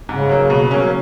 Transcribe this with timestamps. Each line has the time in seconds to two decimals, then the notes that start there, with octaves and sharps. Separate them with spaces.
0.09 G#2 C#3
0.29 F#3 A#3
0.50 B2
0.71 F#3 A#3 C#4